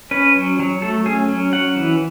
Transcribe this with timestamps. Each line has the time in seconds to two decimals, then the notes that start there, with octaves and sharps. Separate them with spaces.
0.11 C#4 B4
0.35 F#3
0.59 F#3
0.82 A3 A4
1.06 C#4 G#4
1.29 F#3
1.53 C#4 F#5
1.76 E3